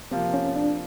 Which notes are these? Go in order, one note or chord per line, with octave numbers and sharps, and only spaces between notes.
C3 F3 A#3 C4
C#4
D4